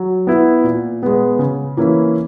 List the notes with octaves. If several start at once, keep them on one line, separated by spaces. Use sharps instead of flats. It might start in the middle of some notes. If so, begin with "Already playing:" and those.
Already playing: F#3
B3 E4
A#2
G#3 B3
C#3
E3 A#3 C#4 E4